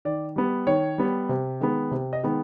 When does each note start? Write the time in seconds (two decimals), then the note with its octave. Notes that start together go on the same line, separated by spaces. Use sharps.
0.05 D#3 D5
0.36 G3 B3
0.67 D#3 C#5
0.98 G3 B3
1.29 C3
1.61 D#3 G#3 B3
1.91 C3
2.13 D#5
2.23 D#3 G#3 B3